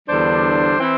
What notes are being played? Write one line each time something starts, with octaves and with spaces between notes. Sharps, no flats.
E2 D3 G3 D4 C5
E3 C4 E4